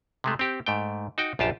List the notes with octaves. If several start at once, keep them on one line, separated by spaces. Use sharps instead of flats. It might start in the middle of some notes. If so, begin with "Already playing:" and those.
C3 G#3 A3
C4 G4
G#2 A3 G5
D#4 F#4 G5
A#1 F#2 F4 G4 A5